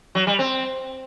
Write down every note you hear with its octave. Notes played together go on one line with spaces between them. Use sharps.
F#3
G3
C4